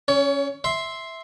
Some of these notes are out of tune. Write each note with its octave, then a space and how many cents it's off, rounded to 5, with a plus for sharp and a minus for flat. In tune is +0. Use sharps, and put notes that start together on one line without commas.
C#4 +0 C#5 +30
E5 -10 C6 +0